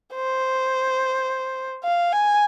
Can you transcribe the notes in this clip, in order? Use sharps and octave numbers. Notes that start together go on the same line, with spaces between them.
C5
F5
G#5